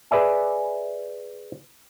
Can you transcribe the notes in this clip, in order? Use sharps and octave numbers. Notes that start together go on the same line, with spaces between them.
G#4 B4 D5 E5 G#5